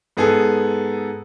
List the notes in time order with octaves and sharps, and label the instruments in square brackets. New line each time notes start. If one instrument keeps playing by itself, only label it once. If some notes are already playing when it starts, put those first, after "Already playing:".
[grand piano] G#2 B3 G#4 A4 G#5